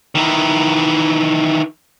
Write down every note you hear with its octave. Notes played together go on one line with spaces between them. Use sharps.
D#3 E3